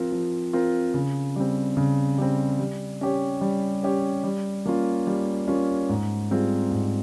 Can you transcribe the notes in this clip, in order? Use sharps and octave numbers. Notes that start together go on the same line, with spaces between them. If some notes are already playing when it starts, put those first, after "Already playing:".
Already playing: F3 C4 F4 A#4
F3
C4 F4 A#4
C#3
G3 C4
C#3
G3 C4
G3
C#4 G4 C#5
G3
C#4 G4 C#5
G3
A#3 C#4 F4
G3
A#3 C#4 F4
G#2
G3 C4 F4 G#4
G#2